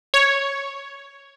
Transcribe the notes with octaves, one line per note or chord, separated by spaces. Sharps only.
C#5